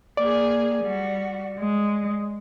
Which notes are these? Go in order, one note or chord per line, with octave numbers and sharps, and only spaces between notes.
A#3 G#4 D5
G3 F#4
G#3